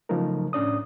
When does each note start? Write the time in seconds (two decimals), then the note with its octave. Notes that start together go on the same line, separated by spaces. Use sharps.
0.09 C#3 F3 F#3 A3 D#4 A#4
0.53 A2 C#4 D4 D5 D#6